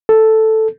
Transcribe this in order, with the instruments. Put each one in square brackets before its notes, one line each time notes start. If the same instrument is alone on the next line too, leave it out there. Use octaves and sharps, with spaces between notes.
[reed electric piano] A4